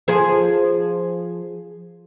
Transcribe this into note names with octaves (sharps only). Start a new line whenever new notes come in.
F3 G#4 C5